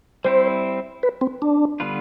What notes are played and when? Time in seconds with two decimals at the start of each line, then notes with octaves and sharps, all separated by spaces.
0.24 G3 C4 E4 C5
1.03 B4
1.21 C4
1.42 D4
1.80 D3 G3 B3 F4 B4